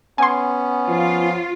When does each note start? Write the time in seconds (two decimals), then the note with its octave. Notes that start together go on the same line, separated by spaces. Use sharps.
0.18 B3 C#4 G#5 C6
0.88 F3 F4